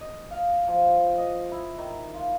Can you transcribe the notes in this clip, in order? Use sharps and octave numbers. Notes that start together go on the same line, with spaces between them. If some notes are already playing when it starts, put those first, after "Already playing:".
D#5
F5
F3
D#5
E4
D#3
F4